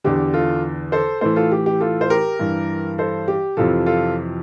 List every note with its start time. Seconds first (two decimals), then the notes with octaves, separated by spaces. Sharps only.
0.04 E2 D3 G4
0.33 F4 A4
0.92 A4 C5
1.21 A2 E3 A4 C5
1.36 F4 A4
1.52 G4
1.66 G4
1.80 F4 A4
2.01 C5
2.10 G4 A#4
2.39 G2 E3
2.98 A4 C5
3.28 G4
3.57 F2 C3 E3 F4 A4
3.86 F4 A4